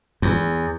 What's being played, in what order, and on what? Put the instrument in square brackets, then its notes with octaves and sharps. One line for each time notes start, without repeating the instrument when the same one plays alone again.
[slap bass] E2